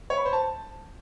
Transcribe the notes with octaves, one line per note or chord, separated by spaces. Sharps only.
C#5
B5
C5
A5